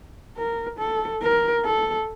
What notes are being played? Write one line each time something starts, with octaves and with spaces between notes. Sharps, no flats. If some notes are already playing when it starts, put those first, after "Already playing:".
A#4
A4
A#4
A4